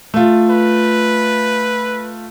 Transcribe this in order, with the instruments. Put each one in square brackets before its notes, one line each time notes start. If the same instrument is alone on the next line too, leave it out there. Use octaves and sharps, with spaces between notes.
[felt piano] A3 F4
[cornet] B4